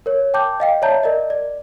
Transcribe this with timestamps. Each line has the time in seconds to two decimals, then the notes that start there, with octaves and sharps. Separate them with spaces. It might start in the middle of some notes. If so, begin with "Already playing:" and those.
0.06 A#4 C#5
0.34 G5 A5 D6 G6
0.60 D#5 F5 G5
0.82 C#5 D5 E5 A5 A#5 G6
1.03 A#4 D5 D#5
1.30 D5